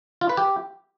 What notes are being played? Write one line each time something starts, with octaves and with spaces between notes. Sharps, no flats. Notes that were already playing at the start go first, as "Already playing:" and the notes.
F4
B4
G4